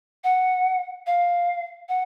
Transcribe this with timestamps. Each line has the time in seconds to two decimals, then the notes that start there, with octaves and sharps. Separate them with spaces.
0.24 F#5
1.07 F5
1.89 F#5